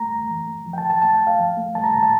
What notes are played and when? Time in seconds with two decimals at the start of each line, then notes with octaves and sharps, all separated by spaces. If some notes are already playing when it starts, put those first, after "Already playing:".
Already playing: G3 A3 A#5
0.12 E2
0.30 E3
0.47 A3
0.66 F3
0.73 G5
0.78 A5
0.84 G2
0.90 A5
1.02 A3 A5
1.14 G5
1.21 G2
1.27 F5
1.39 F3
1.57 A3
1.75 G3 A5
1.84 A#5
1.93 A#2 A5
2.03 A5